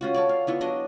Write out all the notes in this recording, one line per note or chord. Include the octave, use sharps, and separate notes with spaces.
C#4 F4 F#4
A4 C#5 D5
F5
B3 E4 F4 C#5
F#3 D4 D#5